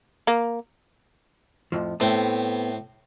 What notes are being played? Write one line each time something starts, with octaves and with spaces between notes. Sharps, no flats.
A#3
F2 A2 F3
A2 A3 B3 C4